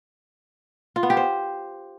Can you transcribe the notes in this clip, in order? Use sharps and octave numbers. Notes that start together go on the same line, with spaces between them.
F4
B3
G4
C5